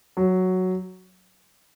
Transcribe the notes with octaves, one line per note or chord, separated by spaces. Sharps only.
F#3